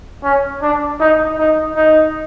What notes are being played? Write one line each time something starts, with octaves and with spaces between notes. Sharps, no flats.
C#4
D4
D#4
D#4
D#4